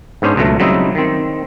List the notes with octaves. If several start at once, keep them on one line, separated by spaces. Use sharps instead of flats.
G#2 B3 C#4 D4 C5
C#2 B2 F#3 A3
C#3 F#3 G3 C4 D#4 E4
D#3 C4